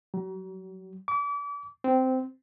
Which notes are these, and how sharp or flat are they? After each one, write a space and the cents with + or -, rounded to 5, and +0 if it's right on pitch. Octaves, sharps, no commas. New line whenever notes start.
F#3 +40
D6 -35
C4 -15